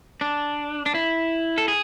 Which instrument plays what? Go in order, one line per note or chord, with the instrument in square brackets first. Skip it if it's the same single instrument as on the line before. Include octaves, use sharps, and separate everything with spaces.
[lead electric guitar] D4
D4
E4
A4
G#4